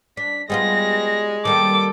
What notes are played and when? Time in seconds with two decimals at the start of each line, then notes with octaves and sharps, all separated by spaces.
0.17 D4 B6
0.50 G3 G#3 B3 F4 A#6
1.45 D#3 G3 A#3 A4 D6